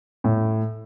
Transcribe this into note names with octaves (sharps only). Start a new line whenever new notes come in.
A2